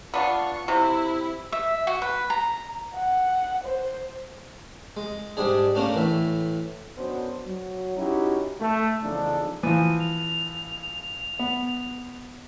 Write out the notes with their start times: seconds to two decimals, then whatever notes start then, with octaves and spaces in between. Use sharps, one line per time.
0.14 B3 D4 F4 C#6
0.68 C3 E4
1.52 E5
1.87 F#4
2.02 B4
2.30 A#5
2.95 F#5
3.63 C5
4.97 G#3
5.37 G#2 G3 D4 G#4
5.75 A3 A#3 C#4 D4
5.94 A2 E3 E5
6.96 F#2 F#3 B3 C#4 D4 C5
7.47 F#3
7.97 C#4 D#4 E4 F#4 G4
8.61 A3
9.03 E2 C#3 F3 D4 D#4 A4
9.63 E3 F3 D#7
10.00 F7
10.82 F7
11.39 B3